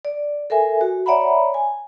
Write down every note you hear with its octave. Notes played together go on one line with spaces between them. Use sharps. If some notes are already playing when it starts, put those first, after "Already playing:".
D5
A4 A#4 E5 G#5
F#4
C#5 D5 E5 F#5 A#5 B5
G#5